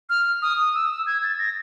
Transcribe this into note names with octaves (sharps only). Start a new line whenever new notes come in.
F6
D#6
D#6
E6
E6
G#6
A6
A#6